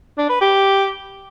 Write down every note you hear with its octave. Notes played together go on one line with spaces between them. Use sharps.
D4
B4
G4